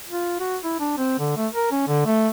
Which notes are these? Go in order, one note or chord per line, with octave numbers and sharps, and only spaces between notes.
F4
F#4
E4
D4
C4
D3
A3
A#4
C#4
D3
A3